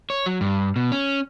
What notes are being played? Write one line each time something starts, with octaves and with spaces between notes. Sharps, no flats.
C#5
F#3
G2
B2
C#4